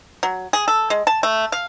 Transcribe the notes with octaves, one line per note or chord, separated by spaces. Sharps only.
F#3
G#4
A4
G#3
A5
A3
F5